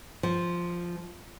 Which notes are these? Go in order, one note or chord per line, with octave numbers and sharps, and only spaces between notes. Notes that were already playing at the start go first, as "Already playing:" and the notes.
F3